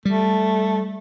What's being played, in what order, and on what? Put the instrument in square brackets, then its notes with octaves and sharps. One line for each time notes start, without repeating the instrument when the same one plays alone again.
[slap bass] G3 [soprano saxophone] A3